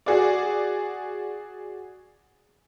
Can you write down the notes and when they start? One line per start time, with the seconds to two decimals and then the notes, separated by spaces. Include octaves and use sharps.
0.06 F#4 G#4 D5